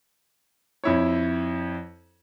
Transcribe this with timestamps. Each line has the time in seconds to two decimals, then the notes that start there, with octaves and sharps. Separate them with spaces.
0.84 F2 E4 C#5